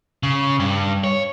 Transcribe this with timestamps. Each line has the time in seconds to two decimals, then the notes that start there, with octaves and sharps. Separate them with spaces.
0.23 C#3
0.60 G2
1.04 C#5